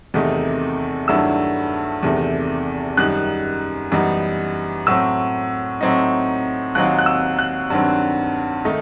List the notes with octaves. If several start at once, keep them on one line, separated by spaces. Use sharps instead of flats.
E2 C3 D#3 A3 D#4
G2 D#3 F#3 A3 E4 E6
E2 C3 D#3 A3
F#2 D#3 G3 D#4 F#6
F#2 E3 G3 B3 D#4
A2 F#3 C4 E6
A2 F#3 C4 D#4
D#2 D#3 F#3 C4 D#4 F#6
F#6
E6
F#6
G2 D#3 F#3 C4
D#3 A3 D#4